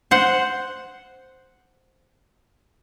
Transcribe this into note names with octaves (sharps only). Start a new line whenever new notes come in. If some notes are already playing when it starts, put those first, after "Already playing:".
C5 F#5